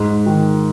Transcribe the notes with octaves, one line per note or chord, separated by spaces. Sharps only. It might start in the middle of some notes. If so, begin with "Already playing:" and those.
Already playing: G#2
D#3